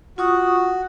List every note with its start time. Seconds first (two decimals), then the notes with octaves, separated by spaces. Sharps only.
0.18 F4 F#4 C#6 D#6